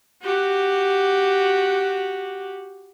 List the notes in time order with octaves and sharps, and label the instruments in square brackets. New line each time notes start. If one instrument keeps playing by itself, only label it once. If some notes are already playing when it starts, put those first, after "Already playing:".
[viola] F#4 G4